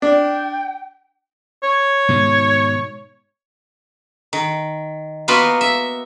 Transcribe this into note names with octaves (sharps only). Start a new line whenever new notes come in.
D4 G5
C#5
G#2 B2 D#3
D#3
A#3 B3 F4 F#4 A#4 B4
E5